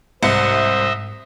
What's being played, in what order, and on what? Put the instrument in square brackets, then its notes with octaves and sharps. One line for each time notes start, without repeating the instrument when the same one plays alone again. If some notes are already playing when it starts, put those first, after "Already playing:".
[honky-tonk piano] C2 C#7 [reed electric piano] G#2 [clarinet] C5 [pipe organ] D#5 E5